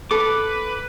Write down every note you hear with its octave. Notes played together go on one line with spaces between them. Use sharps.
A4 B4 D6